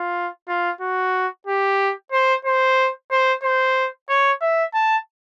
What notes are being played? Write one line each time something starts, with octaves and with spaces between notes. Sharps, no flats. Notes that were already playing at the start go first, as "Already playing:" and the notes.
Already playing: F4
F4
F#4
G4
C5
C5
C5
C5
C#5
E5
A5